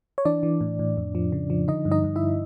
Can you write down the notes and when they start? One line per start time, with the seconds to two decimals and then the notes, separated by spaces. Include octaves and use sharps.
0.18 C#5
0.25 E3 D4 D5
0.43 E3
0.61 A2
0.79 A2
0.97 F2
1.15 F3
1.32 C#3
1.50 F3
1.68 D3 D#4 D#5
1.85 G2
1.91 D#4 D#5
2.04 G2
2.16 E4 E5